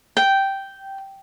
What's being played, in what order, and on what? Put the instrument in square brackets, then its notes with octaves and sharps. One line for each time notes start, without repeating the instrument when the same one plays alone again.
[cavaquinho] G5